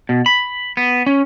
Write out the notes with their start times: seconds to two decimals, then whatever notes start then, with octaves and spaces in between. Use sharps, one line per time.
0.09 B2
0.26 B5
0.77 B3
1.06 C#4